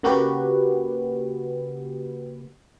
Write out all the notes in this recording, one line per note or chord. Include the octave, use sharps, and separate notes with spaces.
C#3 A#3 F#4 G4 B4